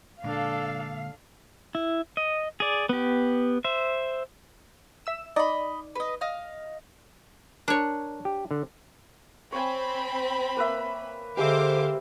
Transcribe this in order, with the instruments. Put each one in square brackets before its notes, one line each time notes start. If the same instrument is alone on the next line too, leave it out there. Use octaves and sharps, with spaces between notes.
[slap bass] A#2 D3 G#3 [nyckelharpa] D4 A4 [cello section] F5
[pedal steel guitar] E4
D#5
G#4 D5
B3 G4
C5 E5
[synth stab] E5 E6 E7
[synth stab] D#4 D5 [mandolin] D#5 B5
[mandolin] B4 D#5
D#5 F5 F6
[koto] D4 C#5 [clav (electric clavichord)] A#4
[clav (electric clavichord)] G4
D3
[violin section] C4 B5 [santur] C#5 G#5
[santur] A#3 B4 E5
[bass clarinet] D3 [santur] G#3 [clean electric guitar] G4 E5 [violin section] C5 F5 D6